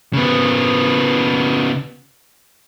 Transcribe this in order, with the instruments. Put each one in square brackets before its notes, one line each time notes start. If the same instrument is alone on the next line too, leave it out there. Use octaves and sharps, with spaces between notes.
[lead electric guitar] C#3 B3